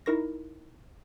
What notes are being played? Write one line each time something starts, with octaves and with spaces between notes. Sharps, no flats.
D#4 E4 A#4 C#6 A#6